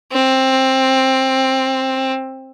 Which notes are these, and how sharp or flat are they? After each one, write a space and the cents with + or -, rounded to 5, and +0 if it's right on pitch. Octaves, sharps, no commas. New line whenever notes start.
C4 +15